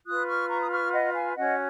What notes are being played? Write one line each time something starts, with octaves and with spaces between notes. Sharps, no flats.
F4 B4 D#6 F#6
C#6 F6
A#5 C#6
D#6
C#6 F6
D#5 F#5
F5 G#5
C#4 F#4 C#5 D#5 F#5